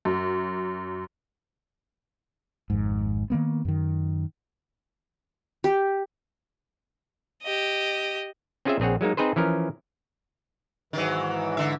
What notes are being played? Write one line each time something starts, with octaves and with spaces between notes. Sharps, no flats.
F#2
G#1 F2 G#2
D#3 F3 A#3 B3
F#2 D#3
G4
G4 D#5
C4 C#4 F4 G#4 C5 E5
A#1 C4 G#4 C#5 F#5
F#3 G#3 A#3 D#4
C4 D#4 G#4 B4 C5
E3 F3 C#4 A#4
G#2 D#3 E3 F#3
D3 E5